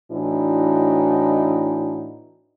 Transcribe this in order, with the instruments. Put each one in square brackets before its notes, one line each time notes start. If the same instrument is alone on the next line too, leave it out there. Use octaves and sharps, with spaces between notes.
[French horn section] A2 E3 D4 D#4 F#4